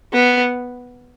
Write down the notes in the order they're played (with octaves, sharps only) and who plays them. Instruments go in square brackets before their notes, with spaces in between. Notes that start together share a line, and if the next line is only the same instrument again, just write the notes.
[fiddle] B3